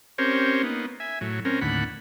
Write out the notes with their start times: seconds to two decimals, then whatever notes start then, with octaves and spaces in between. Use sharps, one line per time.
0.18 C4 C#4 G4 A#4 C5 C#5
0.63 A#3 B3 D#4
1.00 E5 G#5
1.21 A2 F#3
1.45 C4 C#4 A#4
1.61 D#2 A2 D3 F#5 B5